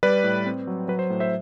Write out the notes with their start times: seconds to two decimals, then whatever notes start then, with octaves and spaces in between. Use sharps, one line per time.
0.03 G3 B4 D5
0.24 A2
0.46 C4
0.67 F#3
0.88 F#3 B4
0.99 C5
1.10 A2
1.20 C5 E5